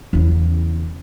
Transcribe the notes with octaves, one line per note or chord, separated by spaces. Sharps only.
E2 C#3